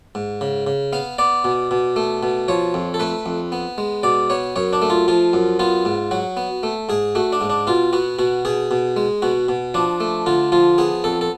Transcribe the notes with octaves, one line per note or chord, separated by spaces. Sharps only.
G#2
C#3
C#3
B3 F5
B3 D5
B2
B2
A3
B2
F3 C#5
F2
A4
A3 B4
F2
B3
G#3
B2 D5
B3 C#5
F#2 C#5
D4
A3
F4
F3 F4
F#2
B3 F4
G#2
F#3 F#4
B3
A3
G#2 G#4
A3 F#4
D4
G#2
D4
B2 F4
B3 F#4
B2 F#4
B2 G#4
B2
G#3
B2 F#4
B2
F3 D4
A3
D3 F4
F3 F4
B3 G#4
F2 A4
A4